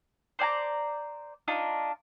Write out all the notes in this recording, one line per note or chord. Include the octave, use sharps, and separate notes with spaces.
C5 D5 G#5 A#5
D4 D#4 F4